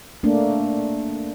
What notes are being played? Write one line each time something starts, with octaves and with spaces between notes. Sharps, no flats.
A3 A#3 D4